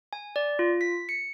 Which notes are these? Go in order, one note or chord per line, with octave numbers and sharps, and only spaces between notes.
G#5
D5
F4
B6
C#7